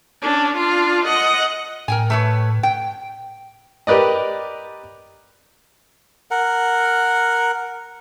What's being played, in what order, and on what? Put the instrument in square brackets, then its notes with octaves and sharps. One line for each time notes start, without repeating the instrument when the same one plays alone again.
[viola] C#4 D4
D4 F4
D#5 F#5
[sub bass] A2 [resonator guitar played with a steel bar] A#4 G5 G#5
[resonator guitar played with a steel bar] A3 B4 C#5
G5
[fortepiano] G4 A#4 B4 D5 D#5
[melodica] A#4 F#5